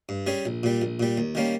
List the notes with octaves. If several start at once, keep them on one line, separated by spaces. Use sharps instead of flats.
G2
G3 C#4 G#4
A#1
A#2 G3
A#1
A#2 G3
D#2
D#3 G3 A#3 C#4